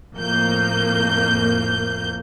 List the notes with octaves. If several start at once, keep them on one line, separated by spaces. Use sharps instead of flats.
F2 A2 A#3 G6